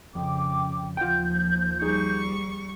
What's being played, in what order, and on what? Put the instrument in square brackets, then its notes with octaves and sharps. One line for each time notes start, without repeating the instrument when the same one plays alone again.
[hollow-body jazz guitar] F2 [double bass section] C#3 [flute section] G5 D6
[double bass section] D#2 F3 [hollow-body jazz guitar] F4 F#5 G5 [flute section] G6
[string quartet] G3 C#6 [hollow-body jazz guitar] D#4 G#4